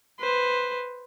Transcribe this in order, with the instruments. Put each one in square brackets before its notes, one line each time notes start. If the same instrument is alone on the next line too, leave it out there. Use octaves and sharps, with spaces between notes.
[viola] B4 C5